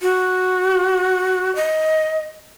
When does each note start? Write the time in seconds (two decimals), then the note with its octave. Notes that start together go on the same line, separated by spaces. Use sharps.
0.02 F#4
1.56 D#5